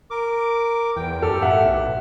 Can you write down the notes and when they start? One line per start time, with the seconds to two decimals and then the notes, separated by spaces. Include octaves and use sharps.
0.10 A#4 D6
0.96 E2 G5
1.22 F#2 G4 A4 F6
1.42 A2 E5 F#5
1.64 B1